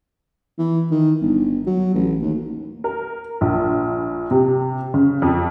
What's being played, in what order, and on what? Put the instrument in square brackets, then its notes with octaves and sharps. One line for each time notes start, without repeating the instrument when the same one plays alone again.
[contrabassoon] E3
D#3
G1
F#3
A1
D#2
[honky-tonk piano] A#4
A#1
C3
C#3
F2